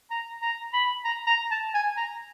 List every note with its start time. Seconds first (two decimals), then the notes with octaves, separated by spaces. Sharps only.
0.10 A#5
0.42 A#5
0.73 B5
1.04 A#5
1.27 A#5
1.51 A5
1.74 G#5
1.97 A#5